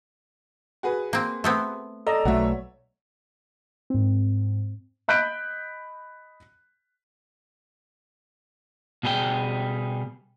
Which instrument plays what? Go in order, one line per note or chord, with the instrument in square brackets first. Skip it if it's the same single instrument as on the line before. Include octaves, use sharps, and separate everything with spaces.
[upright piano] F#4 G#4 B4
[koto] A#3 C4
A3 B3 C4
[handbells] A4 D5 A#5 [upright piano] D#5
[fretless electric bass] B1 A3 [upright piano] F#4 E5 [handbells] C#5
[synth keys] G#2 C4
[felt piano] D#5 B5 F#6 G6 B6 D7
[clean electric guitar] B2 G3 G#4 A4 G5